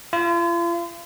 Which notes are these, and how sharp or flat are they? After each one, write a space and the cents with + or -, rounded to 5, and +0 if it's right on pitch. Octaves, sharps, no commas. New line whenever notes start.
F4 -40